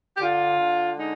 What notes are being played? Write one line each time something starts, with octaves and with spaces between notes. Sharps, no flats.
G4
D3 F4
D3
G#3 D#4